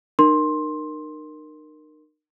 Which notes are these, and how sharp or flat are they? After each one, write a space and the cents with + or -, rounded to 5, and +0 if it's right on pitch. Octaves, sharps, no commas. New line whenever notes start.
D#4 -40 A#4 +0 C6 +10